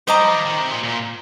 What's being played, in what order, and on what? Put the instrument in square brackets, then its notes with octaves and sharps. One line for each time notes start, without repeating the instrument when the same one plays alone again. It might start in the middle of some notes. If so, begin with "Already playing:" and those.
[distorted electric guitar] G3 [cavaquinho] C5 D#5 A#5 D6
[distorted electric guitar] F3
D#3
D#3
C3
A#2
A#2